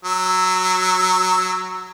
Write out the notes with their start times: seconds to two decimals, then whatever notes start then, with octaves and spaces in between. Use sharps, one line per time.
0.05 F#3 E6